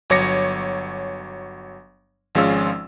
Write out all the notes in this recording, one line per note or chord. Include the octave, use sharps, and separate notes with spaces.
G1 F#3 C#5 D6 A#6 C#7
G#1 F3 G#3 C#4 F4 E6